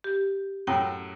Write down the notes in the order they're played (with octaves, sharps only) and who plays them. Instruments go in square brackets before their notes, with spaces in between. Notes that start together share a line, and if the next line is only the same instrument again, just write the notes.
[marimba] G4
[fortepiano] F#2 A2 [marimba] G5